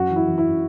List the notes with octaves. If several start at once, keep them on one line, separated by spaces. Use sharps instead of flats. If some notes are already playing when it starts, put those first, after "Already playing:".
Already playing: F#2 F#4
E3
E4
E3
E4